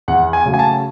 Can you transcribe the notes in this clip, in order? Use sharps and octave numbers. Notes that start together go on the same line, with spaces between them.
E2 F#5
G#5
C#3 F#3 A3
G#5
A5